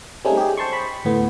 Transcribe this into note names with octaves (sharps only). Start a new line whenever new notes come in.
G3 A3 C4 C#4 D#4 G#4
G4 G#4
C5 A5 C6 C#6
B5
D2 A2 B3